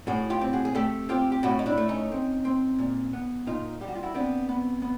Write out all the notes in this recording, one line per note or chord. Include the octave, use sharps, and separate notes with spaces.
A2 F#4 G#4
F4 G4
C4
F#4 G#4
G#4
A3 G4 A4
C4 F4 G4
G4
A2 E4 F#4
D#4
D4 E4
A3
C#4 D#4
C4
C4
A#2
B3
A#2 D#4 F4
G3 G4
F#4
F4
E4 F#4
B3 C4 D4
B3
B3